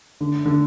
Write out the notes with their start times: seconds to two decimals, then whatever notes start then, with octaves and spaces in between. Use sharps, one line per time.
0.21 D3
0.46 D3